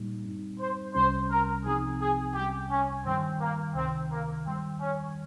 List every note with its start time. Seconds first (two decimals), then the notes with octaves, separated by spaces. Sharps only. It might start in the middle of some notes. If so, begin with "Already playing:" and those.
Already playing: A#2 G3 A#3 D#4
0.24 G2 G3 C4 D#4
0.60 C5
0.95 C2 C3 G3 C#4 C5
1.30 A#4
1.64 C2 C3 F3 C4 D#4 G#4
2.00 G#4
2.34 C2 C3 G3 C#4 G4
2.70 C#4
3.05 G2 D#3 G3 C4
3.40 A#3
3.75 C#2 C3 D#3 C4
4.11 A#3
4.45 G2 D#3 G3 C4
4.80 C#4